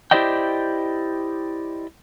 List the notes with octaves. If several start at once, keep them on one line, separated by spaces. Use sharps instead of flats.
E4 G4 C5 D5 D#5 G5